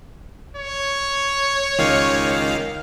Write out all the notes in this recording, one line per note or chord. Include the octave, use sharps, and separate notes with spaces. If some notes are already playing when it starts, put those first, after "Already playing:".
C#5
C#2 D#3 F5